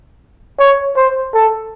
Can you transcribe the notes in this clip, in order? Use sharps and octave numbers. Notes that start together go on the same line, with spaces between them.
C#5
C5
A4